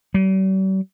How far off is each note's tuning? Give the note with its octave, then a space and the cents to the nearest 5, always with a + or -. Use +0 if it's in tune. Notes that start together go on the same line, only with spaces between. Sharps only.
G3 -45